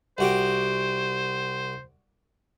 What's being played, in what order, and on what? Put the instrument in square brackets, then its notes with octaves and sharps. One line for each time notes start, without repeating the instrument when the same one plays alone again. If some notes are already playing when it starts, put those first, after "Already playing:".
[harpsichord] C2 F#4 G4 [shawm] C5